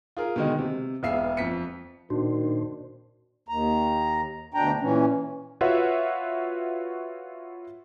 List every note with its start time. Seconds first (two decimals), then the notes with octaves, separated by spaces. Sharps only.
0.17 F4 G#4 A#4
0.36 B2 D3 D#3 G#3 D#4
0.59 C3
1.03 E1 B3 G#4 E5 F5 C7
1.37 F2 B6 C#7
2.10 A#2 D#3 D4 F#4 C5
3.49 D#2 A#5
4.54 D2 B2 D4 G5 A#5
4.81 A#2 E3 C#4
5.61 F4 F#4 B4 C#5 E5 F#5